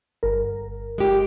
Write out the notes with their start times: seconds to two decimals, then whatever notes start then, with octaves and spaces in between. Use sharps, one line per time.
0.23 G1 A#4
0.98 G#3 G4